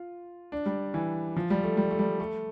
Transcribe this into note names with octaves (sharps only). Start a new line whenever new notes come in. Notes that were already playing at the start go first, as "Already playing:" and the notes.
Already playing: F4
D4
G3
E3
F3
G3
A3
G3
A3
G3
A3